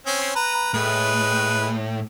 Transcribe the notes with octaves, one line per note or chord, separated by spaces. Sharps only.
C4 C#4 C5
B4 A#5
A2 G#3 B4